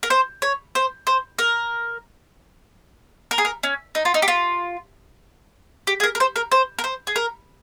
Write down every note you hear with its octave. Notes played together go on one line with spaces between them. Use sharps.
A#4
C5
C#5
C5
C5
A#4
A#4
G#4
A#4
C#4
D#4
F4
D#4
G4
F4
G4
G#4
A#4
A#4
C5
A#4
C5
A#4
C5
G#4
A#4